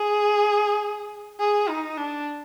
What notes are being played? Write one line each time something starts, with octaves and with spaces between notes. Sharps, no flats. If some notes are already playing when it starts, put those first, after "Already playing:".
Already playing: G#4
G#4
D#4
D4